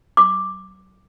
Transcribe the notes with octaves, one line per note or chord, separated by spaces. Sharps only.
D6